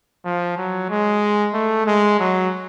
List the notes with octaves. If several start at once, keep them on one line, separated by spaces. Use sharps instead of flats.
F3
F#3
G#3
A3
G#3
F#3